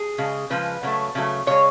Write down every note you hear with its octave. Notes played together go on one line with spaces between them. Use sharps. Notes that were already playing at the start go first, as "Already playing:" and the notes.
Already playing: G#4
C#3 G#3
C#3 F3 G#3 B4
C#3 F#3 A3
C#3 F#3 A3
C#3 G#3 C#5